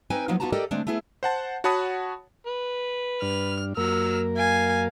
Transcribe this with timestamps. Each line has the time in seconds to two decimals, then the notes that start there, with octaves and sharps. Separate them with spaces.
0.10 C4 D#4 B4 G5 G#5
0.28 F3 F#3 A#3 B3 D#4 F4
0.40 B3 D#4 F4 F#4 A5 A#5
0.52 G4 A4 A#4 D5 D#5 G5
0.71 D3 G#3 A3 C4 D4
0.87 A3 B3 E4 G#4
1.23 C5 F#5 A5
1.64 F#4 C#5 F#5 A5 B5 D#6
2.47 B4
3.22 G2 D4 F6
3.77 F#2 F#3 A#3 A#4 E6 F6
4.38 F5 G#5